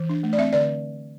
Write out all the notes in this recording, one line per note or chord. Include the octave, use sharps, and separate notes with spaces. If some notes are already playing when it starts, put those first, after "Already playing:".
Already playing: E3
D4
A3
D5
C4 E5
D3 D5